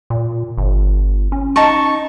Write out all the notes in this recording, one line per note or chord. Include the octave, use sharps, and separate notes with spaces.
A#2
G1
C#4
D#4 A5 C#6